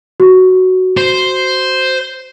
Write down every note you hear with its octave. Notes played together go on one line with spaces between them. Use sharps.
F#4
C5